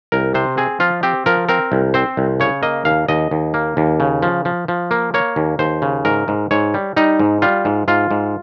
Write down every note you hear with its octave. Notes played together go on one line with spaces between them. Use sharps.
C2 A#4
C3 C5
C4 G#4
F3 F4
C4 G4
F3 A#4
C4 A#4
C2
C4 C5
C2
C#3 C#5
A#3 D#5
D#2 F5
D#2 D#5
D#2
A#3
D#2
C#3
F3
F3
F3
A#3
A#3 C#5
D#2
D#2 C5
C#3
G#2 A#4
G#2
G#2 C#5
G3
G3 D#4
G#2
G3 F4
G#2
G#2 F4
G#2